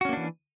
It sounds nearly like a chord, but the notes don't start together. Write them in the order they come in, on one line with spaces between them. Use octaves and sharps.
F#4 C#4 A#3 D4 E3